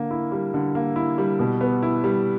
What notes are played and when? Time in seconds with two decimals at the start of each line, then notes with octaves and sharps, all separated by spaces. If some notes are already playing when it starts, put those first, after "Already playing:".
Already playing: D3 A#3
0.11 E4
0.32 G3
0.54 D3
0.75 A#3
0.96 E4
1.18 G3
1.39 B2
1.61 B3
1.83 E4
2.04 G3